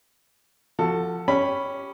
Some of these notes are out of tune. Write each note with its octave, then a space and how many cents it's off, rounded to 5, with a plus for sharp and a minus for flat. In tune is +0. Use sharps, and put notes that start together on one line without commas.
F3 -5 F#4 +0 A4 +15
C#4 +0 G4 +0 B5 +0